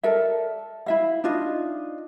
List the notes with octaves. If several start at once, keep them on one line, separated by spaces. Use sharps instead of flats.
A4 A#4 D5 E5
E4 E5 F5
D4 D#4 F4 D#5